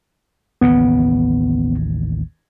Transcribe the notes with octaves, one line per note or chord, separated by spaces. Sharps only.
A1 D#2 C#3 B3